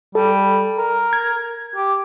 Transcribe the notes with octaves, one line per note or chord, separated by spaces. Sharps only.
G3 A4
A#4
G#6
G4